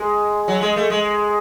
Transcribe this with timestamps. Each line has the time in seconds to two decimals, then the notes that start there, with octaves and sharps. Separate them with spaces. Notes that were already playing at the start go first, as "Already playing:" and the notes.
Already playing: G#3
0.48 F#3
0.61 G#3
0.76 A3
0.90 G#3